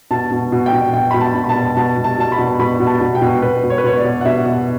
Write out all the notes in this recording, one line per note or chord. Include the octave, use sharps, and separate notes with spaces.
B2 A5
B2
B2
G5
B2
B2 G5
B2 B5
A5
B2
B5
A5
B2
B2 A5
B2
A5
B2 A5
B5
B2
B2 B5
B2
A5
B2
G5
B2
B2 B4
B2
C#5
B4
B2 C#5
D5
B2
F#5
B2 E5
B2